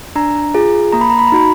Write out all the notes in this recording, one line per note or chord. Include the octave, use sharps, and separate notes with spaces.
D4 A#5
F4 G#4
A#3 A#5
B5
A#5
B5
A#5
D#4 F#4 B5